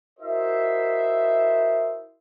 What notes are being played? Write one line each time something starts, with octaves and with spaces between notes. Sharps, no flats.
E4 F#4 A#4 C5 D#5 E5